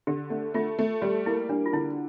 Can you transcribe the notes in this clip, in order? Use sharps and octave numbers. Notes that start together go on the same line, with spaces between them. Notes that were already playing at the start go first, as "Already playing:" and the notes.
D3 G4
A3
A3 F4
A3
G3 G4
A#3 E4
G3 D4
F4
D3 E4